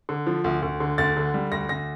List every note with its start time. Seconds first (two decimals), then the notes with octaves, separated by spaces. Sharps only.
0.09 D3
0.27 F3
0.44 D2
0.62 D2
0.80 D3
0.98 D2 A6
1.17 D3
1.34 G3
1.51 D2 A#6
1.69 D2 A#6